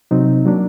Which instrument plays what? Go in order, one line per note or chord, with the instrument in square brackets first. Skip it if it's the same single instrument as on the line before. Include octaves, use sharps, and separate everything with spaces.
[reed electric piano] C3 F#3 C4 D#4
F#3 A#3 D4